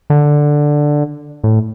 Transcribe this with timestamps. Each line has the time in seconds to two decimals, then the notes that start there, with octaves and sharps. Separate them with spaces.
0.10 D3
1.44 A2